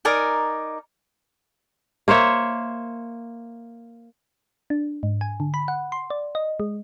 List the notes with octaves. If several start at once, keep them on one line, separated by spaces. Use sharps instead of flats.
D#4 A#4 D5 G#5
A#3 C5 C#5 E5
D4
G#2
G#5
D3
B5
F#5
C6
D5
D#5
G#3